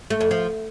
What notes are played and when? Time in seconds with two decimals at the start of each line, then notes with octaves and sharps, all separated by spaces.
0.10 A3
0.21 F2
0.31 F3